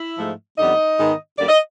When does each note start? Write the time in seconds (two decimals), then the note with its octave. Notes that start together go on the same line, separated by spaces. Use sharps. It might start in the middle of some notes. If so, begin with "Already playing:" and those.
Already playing: E4 E5
0.18 G#2 F3 A3
0.58 F2 D3 G3 B3 D#4 D#5
0.98 G#2 D#3 G#3 B3
1.38 F#2 D3 G3 A#3 D5
1.49 D#5